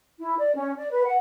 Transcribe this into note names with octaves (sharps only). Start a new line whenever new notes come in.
E4
D5
C#4
D5
B4
F#5